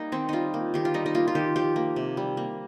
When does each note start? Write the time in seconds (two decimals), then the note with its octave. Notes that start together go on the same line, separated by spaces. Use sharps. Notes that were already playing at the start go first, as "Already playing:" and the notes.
Already playing: G3 A#3 D#4
0.12 D#3 C4
0.29 G3 D#4 F4
0.54 A#3
0.74 D#3 G4
0.85 F4
0.94 G3 D#4
1.06 D#4
1.15 A#3 F4
1.28 F4
1.35 D#3 G4
1.56 F3 G4
1.76 A#3
1.96 C3
2.17 G3
2.37 A#3